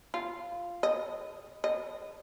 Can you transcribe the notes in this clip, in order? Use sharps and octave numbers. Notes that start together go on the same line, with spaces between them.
F4
D#5
D#5